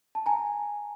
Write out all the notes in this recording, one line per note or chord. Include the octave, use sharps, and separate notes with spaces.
A5
G#5 A#5